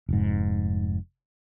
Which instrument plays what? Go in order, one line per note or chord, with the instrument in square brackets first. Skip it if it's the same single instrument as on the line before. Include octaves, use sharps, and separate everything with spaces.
[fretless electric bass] F1 G#2